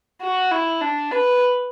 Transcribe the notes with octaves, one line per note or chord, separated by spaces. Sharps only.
F#4
E4
D4
B4